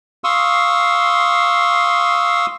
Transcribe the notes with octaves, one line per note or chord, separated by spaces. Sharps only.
F5 C6 C#6 D#6 E6